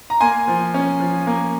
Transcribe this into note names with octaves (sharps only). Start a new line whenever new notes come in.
A#5
A#3 G#5 C6
F3
C#4
F3
A#3